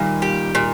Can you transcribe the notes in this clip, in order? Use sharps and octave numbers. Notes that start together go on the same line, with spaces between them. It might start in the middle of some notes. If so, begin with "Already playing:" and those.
Already playing: A#2 D#3 G3 A#3
G4
A#2